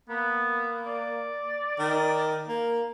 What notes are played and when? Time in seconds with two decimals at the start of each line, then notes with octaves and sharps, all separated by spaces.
0.09 A#3 B3
0.86 D5
1.79 D#3
2.48 A#3